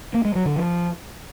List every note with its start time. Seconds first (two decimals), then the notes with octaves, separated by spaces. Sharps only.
0.14 A#3
0.25 G#3
0.35 F#3
0.46 D3
0.56 F3